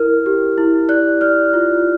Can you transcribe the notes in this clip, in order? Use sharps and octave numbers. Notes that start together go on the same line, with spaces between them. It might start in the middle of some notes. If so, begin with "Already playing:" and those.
Already playing: E4 A#4 F6
G4
E4
D5 F#6
D5 F6
F4